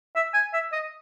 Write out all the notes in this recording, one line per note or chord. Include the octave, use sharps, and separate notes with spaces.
E5
G#5
E5
D#5